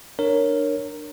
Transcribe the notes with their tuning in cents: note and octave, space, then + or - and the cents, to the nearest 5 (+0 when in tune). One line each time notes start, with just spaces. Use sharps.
D4 +20 A#4 -5 C#5 +0